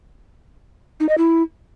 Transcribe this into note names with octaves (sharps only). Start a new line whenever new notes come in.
D#4
D#5
E4